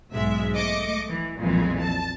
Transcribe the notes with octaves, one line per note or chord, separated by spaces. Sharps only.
B1 G#2 G#3 E5
A3 D#5 D6 C#7
E3
B1 F2 A#2 E3 G#3
A5